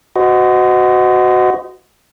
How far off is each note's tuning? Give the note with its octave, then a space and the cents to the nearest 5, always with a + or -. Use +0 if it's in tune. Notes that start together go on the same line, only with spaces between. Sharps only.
F#4 +0 C5 -35 D#5 +0